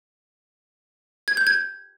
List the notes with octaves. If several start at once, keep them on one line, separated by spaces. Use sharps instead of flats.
G#6
G6
G#6